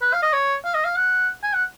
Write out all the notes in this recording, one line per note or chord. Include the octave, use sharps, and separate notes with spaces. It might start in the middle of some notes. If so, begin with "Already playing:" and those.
B4
F5
D#5
C#5
F5
D#5
F5
F#5
G#5
F#5